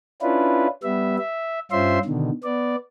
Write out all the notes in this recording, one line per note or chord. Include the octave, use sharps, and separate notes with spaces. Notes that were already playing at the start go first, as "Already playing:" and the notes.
C#4 D4 E4 F4 B4
G3 B3 E5
E5
G2 C#4 F4 C5 E5 C6
B2 D3 D#3
B3 D5